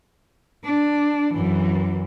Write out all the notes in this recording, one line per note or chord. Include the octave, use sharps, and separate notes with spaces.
D4
F#2 E3